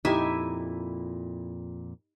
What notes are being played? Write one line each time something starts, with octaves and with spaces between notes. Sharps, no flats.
F2 A#2 D#4 E4 G4 E5 G#5